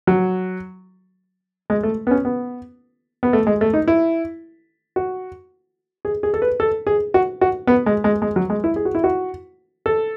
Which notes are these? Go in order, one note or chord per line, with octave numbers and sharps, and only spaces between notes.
F#3
G#3
A3
B3
C#4
B3
B3
A3
G#3
A3
D#4
E4
F#4
G#4
G#4
A4
B4
A4
G#4
F#4
F#4
B3
G#3
G#3
G#3
F#3
G#3
E4
G#4
F#4
E4
F#4
A4